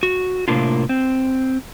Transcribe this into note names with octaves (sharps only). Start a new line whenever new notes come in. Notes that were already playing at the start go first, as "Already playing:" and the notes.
F#4
A2 C3 G#3 A#3 D4 F4
C4